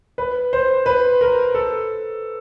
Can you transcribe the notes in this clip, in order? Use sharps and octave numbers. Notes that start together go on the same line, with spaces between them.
B4
C5
B4
A#4
A4